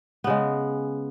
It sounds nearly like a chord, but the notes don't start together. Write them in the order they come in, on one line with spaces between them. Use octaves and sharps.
B3 C#3 G#3